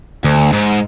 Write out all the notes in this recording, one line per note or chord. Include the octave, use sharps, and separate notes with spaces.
D2
G#2